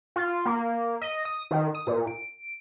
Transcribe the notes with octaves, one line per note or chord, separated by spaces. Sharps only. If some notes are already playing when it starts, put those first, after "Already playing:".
F4
A#3
D#5
D#6
D#3
D#6
A#2
D7